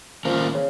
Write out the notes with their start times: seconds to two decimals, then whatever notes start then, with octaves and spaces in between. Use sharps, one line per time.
0.25 D#3 F3 A#3 C#4 A#4
0.54 C#3